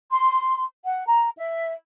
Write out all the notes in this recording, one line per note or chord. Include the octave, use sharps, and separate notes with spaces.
C6
F#5
A#5
E5